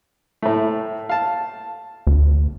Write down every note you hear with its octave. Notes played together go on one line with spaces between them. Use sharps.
A2 A3
F5 A5
D2